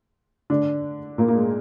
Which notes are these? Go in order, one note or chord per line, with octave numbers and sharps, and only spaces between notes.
D3 D4
A#2 A#3
A#3
G#3